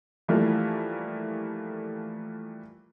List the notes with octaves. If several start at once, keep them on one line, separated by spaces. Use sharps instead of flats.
E3 F3 G3 A3 A#3